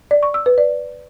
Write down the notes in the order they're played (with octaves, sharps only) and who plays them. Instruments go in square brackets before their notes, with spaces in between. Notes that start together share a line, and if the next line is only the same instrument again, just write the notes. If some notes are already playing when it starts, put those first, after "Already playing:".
[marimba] D5
C#6
E6
B4
D5